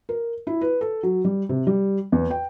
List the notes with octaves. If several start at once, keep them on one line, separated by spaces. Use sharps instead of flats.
A#4
E4
B4
A4
F#3
G3
C3
G3
E2
G5